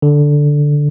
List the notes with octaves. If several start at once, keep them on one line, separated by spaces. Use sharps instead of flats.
D3